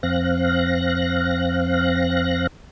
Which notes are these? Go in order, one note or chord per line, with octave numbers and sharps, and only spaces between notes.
F2 C4 F5 F#6 A#6